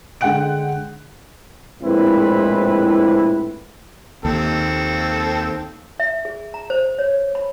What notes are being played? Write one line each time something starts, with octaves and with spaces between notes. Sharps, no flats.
D3 G#3 F#5 G5 F#6 D7
A#1 A2 G#3 C4 E4 B4
D#2 C4 A4
E5
G#4
A#5
C5
C#5
B5